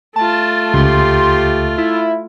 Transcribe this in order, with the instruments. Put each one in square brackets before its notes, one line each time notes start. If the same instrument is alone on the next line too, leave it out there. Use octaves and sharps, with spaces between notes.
[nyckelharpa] A3 F4 [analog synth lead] A5
[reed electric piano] C#2 [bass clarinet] G4 [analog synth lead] C6
[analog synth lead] E4